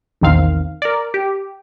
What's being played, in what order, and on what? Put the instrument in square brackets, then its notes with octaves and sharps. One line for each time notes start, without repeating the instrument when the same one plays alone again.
[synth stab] A#1 E2 D#3 C4 F5
A#4 D5
G4